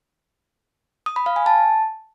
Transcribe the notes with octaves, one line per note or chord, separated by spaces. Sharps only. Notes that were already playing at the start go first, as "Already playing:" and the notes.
D#6
B5
F5
G#5
A5